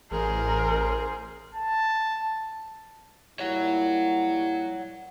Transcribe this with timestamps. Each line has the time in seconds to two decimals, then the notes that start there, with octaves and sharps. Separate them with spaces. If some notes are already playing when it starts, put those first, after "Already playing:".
0.11 A1 G#4 A#4 C5
1.55 A5
3.40 A#2 G3 E4 C#5 F#5